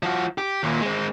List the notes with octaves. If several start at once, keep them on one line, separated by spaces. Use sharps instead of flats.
F3 F#4
G4
D#2 A#2
G#3 C4